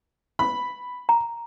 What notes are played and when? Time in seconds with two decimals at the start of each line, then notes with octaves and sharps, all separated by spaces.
0.39 B5
1.09 A#5